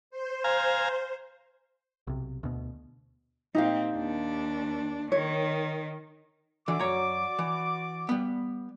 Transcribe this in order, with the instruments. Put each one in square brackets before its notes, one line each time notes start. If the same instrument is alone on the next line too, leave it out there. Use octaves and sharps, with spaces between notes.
[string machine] C5
[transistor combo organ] F5 G#5 A#5
[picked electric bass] B1 C3
D2 B2
[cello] A#2 C4 [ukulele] D#4 G4 F5
[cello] D#2 D4
[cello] D#3 [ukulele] C#5
[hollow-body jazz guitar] D3 E3 [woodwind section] F#4 D5 D6
[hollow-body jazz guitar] F#2 C#5 A#5
E3
G3 B3